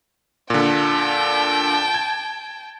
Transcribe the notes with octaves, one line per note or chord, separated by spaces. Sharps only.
A#2 D3 G5 A5
G#6